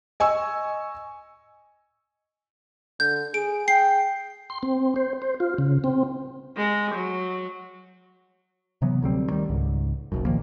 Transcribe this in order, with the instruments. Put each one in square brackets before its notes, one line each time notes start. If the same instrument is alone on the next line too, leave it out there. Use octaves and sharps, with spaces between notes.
[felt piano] D#5 G#5 C#6 E6
[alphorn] D3 [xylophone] G6
[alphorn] G#4 [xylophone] D7
[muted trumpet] G5 [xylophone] C7
[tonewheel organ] C6
C4
C5
C5
F4
C#3
C4
[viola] G#3
F#3
[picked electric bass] C3 E3 F#3 B3
D2 F#3 G3 C4
D#3 G3
C#2 G#2
F#1 B1 F#2
A#2 D#3 F3 A#3